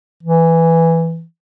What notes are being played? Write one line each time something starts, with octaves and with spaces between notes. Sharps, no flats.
E3